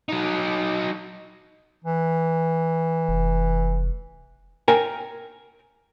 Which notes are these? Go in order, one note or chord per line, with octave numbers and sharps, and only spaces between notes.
F#3 D#4
E3
F1
A#4 G5 G#5 A#5